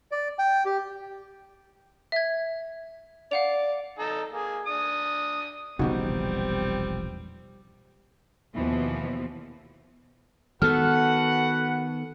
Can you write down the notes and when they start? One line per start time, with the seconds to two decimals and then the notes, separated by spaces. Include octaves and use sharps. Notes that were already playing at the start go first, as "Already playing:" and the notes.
0.12 D5
0.39 G5
0.65 G4
2.12 E5 G#6
3.31 D5 F5 F#5 F7
3.99 D#4 A4
4.32 A#3 G#4
4.66 D4 D#6
5.79 E1 A#1 C#3 G3 B3 C4 D#4 F#4
8.54 D#2 B2 E3 F3
10.62 D#3 B3 F#4 A4 B4 F#5 F6